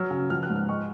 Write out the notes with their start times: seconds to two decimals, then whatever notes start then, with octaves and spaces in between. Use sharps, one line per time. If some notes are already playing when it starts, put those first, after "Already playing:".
Already playing: F#3 F6
0.11 C#3
0.30 F3 F6
0.43 F#6
0.49 G#2
0.56 F6
0.69 G#3 C#6